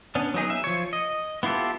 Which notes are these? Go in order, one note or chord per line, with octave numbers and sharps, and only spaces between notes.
B3 C#4 D4
F#3 B3 D#4 G#4
E5
F3 C#5
D#5
B3 E4 F4 G4 A4